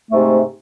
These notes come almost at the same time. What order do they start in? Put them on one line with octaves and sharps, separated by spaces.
A3 G#2 C3